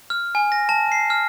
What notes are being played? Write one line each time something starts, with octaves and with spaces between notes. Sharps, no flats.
F6
G#5
A#6
A5
C7
F6